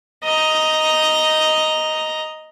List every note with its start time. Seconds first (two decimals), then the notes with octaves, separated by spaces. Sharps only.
0.24 D#5 A#5